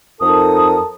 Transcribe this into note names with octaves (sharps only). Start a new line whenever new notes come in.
F2 D#4 A4 A#4 A5 D#6